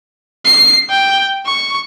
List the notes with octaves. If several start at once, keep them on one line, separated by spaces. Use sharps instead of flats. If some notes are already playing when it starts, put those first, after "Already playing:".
C7
G5
C#6